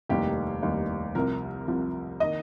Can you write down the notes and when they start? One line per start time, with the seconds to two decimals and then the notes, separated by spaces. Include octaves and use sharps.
0.09 F1 D#2 D#3 G3 G4
0.62 F1 D#2 D#3 G3
1.15 C2 C3 F3 A#4
1.67 C2 C3 F3
2.20 D#3 A#3 D#5